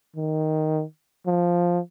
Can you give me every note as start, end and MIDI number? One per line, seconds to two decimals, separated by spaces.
0.16 0.83 51
1.26 1.79 53